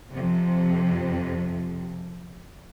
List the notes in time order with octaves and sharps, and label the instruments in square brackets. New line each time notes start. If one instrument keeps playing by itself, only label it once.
[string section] F2 C3